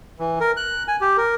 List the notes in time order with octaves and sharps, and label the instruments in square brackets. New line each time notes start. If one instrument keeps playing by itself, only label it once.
[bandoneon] E3
A#4
F#6
G#5
G4
A#4